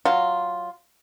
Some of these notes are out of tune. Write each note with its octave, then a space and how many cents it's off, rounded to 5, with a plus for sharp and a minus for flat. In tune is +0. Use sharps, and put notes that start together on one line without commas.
F#3 +0 F4 +0